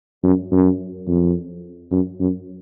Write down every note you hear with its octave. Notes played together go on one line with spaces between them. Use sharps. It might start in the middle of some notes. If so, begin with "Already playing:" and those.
F#2
F#2
F2
F#2
F#2